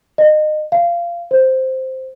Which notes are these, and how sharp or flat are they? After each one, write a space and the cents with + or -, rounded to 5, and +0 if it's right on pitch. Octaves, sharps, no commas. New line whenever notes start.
D#5 -25
F5 -20
C5 +0